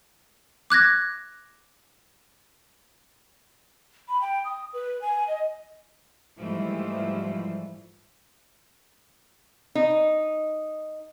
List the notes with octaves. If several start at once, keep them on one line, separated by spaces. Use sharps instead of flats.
D6 F#6 G#6 A#6
B5
G5
D#6
B4
G#5
D#5
G#2 E3 F3 G3 A3
D#4